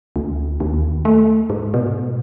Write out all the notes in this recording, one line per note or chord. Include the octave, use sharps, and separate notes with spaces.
D2
D#2
A3
G#2
B2